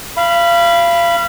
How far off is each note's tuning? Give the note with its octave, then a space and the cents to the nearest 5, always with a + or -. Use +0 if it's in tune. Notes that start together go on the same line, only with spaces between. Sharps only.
F5 -30 B5 +0